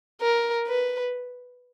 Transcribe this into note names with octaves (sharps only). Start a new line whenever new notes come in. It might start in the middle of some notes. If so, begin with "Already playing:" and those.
A#4
B4